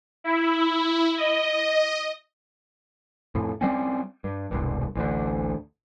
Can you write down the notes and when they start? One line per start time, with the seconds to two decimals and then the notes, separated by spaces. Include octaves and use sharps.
0.24 E4
1.18 D#5
3.35 F2 A2
3.61 G3 C4 C#4
4.24 G2
4.51 E1 C2 G2
4.95 A1 D2 D3